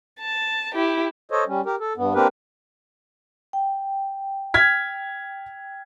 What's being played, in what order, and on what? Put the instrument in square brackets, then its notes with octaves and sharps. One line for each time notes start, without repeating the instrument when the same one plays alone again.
[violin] A5
E4 G4
[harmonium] A4 C5 C#5 D#5
G3 C#4
G4 A#4
A4
G2 B3
A#3 C4 D4 G4 A#4 B4
[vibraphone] G5
[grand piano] F6 G#6 B6